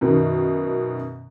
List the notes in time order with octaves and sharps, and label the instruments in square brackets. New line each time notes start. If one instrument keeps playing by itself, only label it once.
[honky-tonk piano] F#2 B2 D#3